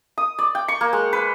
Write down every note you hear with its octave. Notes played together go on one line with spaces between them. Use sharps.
D#6
D5
G5
C#6
A#3
G#3
B4